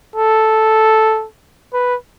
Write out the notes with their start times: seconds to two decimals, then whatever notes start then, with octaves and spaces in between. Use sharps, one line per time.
0.15 A4
1.73 B4